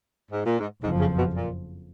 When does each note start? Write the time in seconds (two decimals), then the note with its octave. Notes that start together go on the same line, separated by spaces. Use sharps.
0.31 G#2
0.45 A#2
0.59 G#2
0.82 F#1 F2 G#2 F3
0.99 C#3
1.17 B2
1.34 A#2